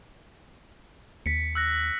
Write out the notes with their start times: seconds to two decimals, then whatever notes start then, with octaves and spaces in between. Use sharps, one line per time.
1.26 D#2 B6 C#7
1.55 E6 F#6 A#6